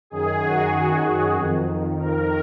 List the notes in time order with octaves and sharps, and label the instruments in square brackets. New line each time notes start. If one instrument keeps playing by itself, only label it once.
[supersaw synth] F#2 D#3 G#4
F#4
F2 D#3
A#4